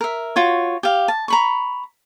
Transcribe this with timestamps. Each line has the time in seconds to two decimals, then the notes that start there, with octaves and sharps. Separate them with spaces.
0.01 A#4 E5
0.36 F4 F#4 C#5
0.83 G4 F5
1.08 A5
1.28 A#5 B5 C#6